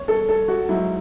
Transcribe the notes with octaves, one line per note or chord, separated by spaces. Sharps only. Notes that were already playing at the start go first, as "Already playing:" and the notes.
Already playing: C#5
A4
A4
F#4
G#2 F#3 E4